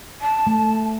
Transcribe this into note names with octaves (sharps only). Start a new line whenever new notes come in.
A5
A3